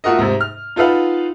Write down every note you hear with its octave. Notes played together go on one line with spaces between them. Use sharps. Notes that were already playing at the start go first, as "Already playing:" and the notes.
A3 F4 F#4 A#4 D#5
G#2 C3
F6
D#4 F4 A4 B4 F5 F#5